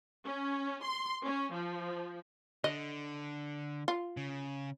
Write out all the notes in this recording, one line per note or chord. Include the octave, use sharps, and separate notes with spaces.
C#4
C6
C#4
F3
D3 D#5
F4
C#3